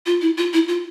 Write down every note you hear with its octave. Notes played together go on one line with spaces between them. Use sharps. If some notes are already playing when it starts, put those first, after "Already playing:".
F4
E4
F4
E4
F4